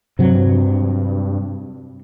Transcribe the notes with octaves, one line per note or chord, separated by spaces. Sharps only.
G2 C3 F#3